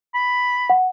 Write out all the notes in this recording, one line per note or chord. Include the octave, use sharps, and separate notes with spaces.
B5
F#5